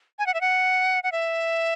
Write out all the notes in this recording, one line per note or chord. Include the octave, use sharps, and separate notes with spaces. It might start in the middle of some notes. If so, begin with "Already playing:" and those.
G#5
F#5
E5
F#5
F#5
E5